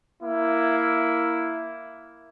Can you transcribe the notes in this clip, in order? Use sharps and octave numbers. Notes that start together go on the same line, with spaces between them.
A#3 E4